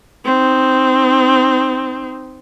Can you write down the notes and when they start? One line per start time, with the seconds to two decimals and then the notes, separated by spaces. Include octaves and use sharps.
0.25 C4 D#4